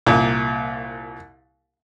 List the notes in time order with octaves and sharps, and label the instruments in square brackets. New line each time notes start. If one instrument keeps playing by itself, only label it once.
[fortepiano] C2 A#2